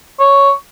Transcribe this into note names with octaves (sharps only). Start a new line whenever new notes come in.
C#5